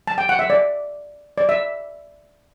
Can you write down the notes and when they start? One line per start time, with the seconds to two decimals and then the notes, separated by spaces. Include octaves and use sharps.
0.07 A5
0.18 G5
0.29 F#5
0.39 E5
0.50 D5
1.38 D5
1.49 E5